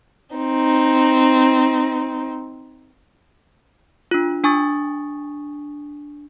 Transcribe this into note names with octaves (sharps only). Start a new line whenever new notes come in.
C4 D#4
D4 F4
D4 G#5 C#6 D#6 A6